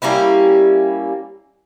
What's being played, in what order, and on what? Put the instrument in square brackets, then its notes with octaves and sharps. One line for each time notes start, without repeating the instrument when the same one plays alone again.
[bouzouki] G3 A#3 C#4 E4